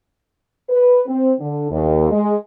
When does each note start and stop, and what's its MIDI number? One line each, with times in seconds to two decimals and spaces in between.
0.69 1.01 71
1.07 1.32 60
1.39 1.68 50
1.70 2.08 39
2.10 2.35 56